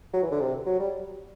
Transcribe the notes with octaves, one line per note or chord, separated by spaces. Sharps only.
F#3
E3
D3
C3
F#3
G3